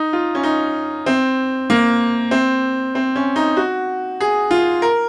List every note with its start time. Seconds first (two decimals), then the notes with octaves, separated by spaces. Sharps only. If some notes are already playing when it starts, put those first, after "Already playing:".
Already playing: D#4
0.13 F4
0.35 C#4
0.43 D#4
1.06 C4
1.70 A#3
2.31 C4
2.95 C4
3.16 C#4
3.36 D#4
3.57 F#4
4.20 G#4
4.51 F4
4.82 A#4